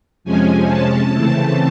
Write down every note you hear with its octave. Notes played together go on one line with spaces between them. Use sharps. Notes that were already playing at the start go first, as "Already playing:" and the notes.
F2 C3 F3 G#3 C#4 G#5
A5
C#3 E3 A3 C4